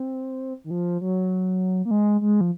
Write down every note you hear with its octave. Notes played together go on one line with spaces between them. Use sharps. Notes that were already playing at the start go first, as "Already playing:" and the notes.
Already playing: C4
D#3
F3
F#3
A#3
G#3
G#3
F3